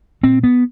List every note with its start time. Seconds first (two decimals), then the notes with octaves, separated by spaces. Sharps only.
0.23 A#2 C4
0.43 B3